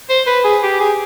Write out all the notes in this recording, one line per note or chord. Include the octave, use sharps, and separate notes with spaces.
C5
B4
G#4
G4
G#4